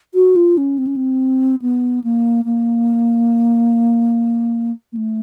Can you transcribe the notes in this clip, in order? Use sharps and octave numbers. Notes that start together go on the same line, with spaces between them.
F#4
F4
C#4
C4
C#4
C4
B3
A#3
A#3
A#3
A3